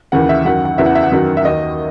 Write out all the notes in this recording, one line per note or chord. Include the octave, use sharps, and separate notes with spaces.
D#2 C#3 E3 F#5
E5
F#2 D#3 F#5
F#5
E2 C#3 E3 E5
F#5
E5
F#5
F#2 D#3
E5
D#2 D#3 D#5